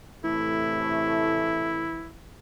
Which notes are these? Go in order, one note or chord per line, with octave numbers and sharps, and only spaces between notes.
A2 C3 E3 A3 E4